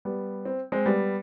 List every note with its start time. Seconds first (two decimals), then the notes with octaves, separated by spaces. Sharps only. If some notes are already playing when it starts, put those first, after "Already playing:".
0.05 G3 B3
0.45 C4
0.72 G#3 C4
0.86 G3 B3